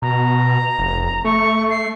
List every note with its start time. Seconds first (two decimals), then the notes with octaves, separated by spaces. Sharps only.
0.02 B2 A#5
0.79 F1
1.25 A3 C#6
1.70 C7